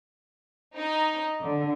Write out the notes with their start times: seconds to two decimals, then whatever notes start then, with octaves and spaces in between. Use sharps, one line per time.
0.77 D#4
1.42 D3